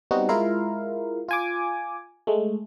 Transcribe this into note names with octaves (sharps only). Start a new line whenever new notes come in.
G3 B3 C4 D#4 F#4
G#3 E4 F4 A#4 F5
F4 G#5 D6
G#3 A3